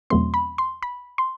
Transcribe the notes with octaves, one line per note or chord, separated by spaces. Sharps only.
E2 B2 F#3 A3 C4 C6
B5
C6
B5
C6